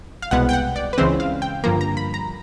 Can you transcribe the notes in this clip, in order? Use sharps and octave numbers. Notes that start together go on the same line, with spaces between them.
F5
C2 B2 G#3 B3 F#5
G5
F#5
D5
B4
C#2 C#3 E3 G#3 C4 C5
F5
G5
G2 D3 F3 A#3 A#5
A#5
B5
A#5